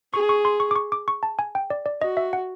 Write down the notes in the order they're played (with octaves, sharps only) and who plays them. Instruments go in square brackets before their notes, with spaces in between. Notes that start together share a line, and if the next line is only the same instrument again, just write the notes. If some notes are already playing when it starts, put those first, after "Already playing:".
[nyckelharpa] G#4 [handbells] C#6
[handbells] C#6
C6
C#6
D6
C#6
D6
C#6
A5
G#5
G5
D5
D5
[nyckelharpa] F#4 [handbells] D#5
[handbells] E5
F#5